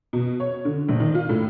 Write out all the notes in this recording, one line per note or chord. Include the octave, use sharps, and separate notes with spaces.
B2
C#5
D3
A#1
D#3
F4
A2